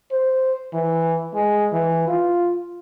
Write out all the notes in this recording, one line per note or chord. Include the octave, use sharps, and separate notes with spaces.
C5
E3
G#3
E3
F4